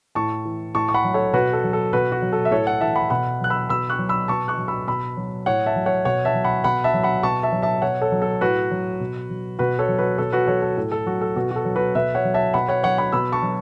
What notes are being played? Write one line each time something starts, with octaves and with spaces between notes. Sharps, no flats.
A2 A5 C#6
E3
A2 A5 C#6
C#6
F#5 B5
F#3
A4 C#5
B2 F#4 B4
A4
F#3
A4
B2 F#4 B4
F#4
F#3
A4
E5
A2 A4 C#5
C#5 F#5
E3 E5 A5
F#5 B5
B2 F#5 B5
F#3 F#6
B5 E6
B2 B5 E6
C#6 F#6
F#3
B5 E6
B2 A5 C#6
C#6 F#6
F#3
B5 E6
B2 B5 E6
F#3
A2 C#5 F#5
E5 A5
F#3
C#5 F#5
B2 C#5 F#5
E5 A5
F#3
F#5 B5
B2 F#5 B5
E5 A5
F#3
F#5 B5
B2 A5 C#6
E5 A5
F#3
E5 A5
B2 C#5 F#5
A4 C#5
F#3
A4
A2 F#4 B4
F#3
B2
F#3
B2 F#4 B4
A4 C#5
F#3
F#4 B4
B2 A4 C#5
F#4 B4
F#3 A4 C#5
A4
A2 A4
A4
F#3 F#4
A4
B2 F#4
F#4
A4
F#3
F#4 B4
B2 B4 E5
C#5 F#5
F#3
E5 A5
B2 F#5 B5
C#5 F#5
F#3 C#5 F#5
F#5 B5
B2 B5 E6
A5 C#6
F#3